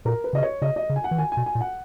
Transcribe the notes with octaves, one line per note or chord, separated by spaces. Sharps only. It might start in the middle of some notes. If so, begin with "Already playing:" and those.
A#2 A#4
B4
C#3 D#5
C#5
C#3 D#5
D#5
C#3
G#5
F#5
E3
D#3 G#5
G#5
B2
G#5
A#2
F#5